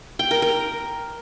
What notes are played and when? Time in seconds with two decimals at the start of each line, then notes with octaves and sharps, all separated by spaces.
0.19 G5
0.31 A#4
0.42 A#4